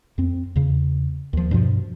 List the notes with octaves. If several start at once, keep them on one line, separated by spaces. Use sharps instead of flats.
F2 C4
E2 C#3
D#2 F3
G2 B2 F3